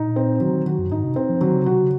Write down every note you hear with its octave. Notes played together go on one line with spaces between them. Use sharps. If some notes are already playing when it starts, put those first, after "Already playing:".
Already playing: A#2 D#4
C4
D#3 F#3
D#3
D#3 F#4
F#2
G#2 D#4
C3
C4
F3
D#3 F#3
C#3
C3 F#4
C#3